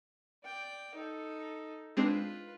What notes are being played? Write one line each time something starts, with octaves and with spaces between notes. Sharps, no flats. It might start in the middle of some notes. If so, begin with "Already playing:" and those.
D5 G5
D#4 A4
G#3 C4 D4 F4 B4